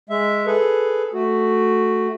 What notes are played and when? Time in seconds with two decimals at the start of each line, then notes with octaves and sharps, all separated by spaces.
0.10 G#3 E5
0.46 G#4 A4 B4
1.14 A3 F#4